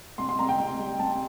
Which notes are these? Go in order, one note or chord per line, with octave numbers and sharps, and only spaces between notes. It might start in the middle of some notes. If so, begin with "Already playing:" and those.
C2 C6
C6
C2 A#5
G5
C2
G3
C2 A5